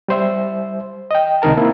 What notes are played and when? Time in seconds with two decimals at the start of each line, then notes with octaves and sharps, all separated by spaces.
0.08 G3 C5 E5
1.11 D#5 G5
1.42 C#2 C3 D#3 D#4 A#4 A5
1.57 A#3 C4 E4